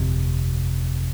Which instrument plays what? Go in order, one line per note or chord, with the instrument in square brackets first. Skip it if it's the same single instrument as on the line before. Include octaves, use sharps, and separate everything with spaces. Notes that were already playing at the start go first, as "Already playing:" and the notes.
Already playing: [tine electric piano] G1 F2 C3